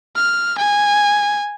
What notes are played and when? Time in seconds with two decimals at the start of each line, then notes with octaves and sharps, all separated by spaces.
0.16 F6
0.58 G#5